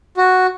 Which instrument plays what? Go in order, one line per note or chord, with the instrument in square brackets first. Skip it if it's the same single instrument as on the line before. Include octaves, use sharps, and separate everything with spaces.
[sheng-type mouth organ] F#4